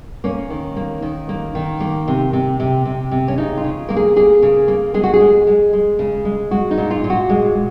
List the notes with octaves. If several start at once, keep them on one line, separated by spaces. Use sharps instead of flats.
A#3 C#4
D#3
A#3
D#3
A#3
D#3
A#3
C3
C3
C3
C3
C3
C#4
C#3 D#4
F4
C#3
A#3 A#4
G#4
A#3 G#4
C#3
A#3
G#3 G#4
F#4
G#4
G#3
G#3
G#3
C#3
G#3
G#3 F#4
D#4
A#2
F4
A#2
F#4
G#3